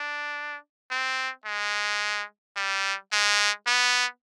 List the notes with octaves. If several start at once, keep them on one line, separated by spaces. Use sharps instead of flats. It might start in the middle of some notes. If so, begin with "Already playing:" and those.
Already playing: D4
C4
G#3
G3
G#3
B3